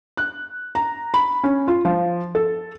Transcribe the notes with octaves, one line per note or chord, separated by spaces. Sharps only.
F#6
A#5
B5
C#4
F4
F3
A4